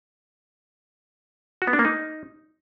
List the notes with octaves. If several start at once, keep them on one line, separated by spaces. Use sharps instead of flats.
F#4
B3
D4
A#3
D#4